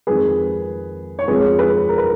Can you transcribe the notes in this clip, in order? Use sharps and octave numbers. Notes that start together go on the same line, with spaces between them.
F2 D#3 G#3 G#4 B4
C#5
F2 F3 G#3 G#4 B4
G#4 B4
A#4
B4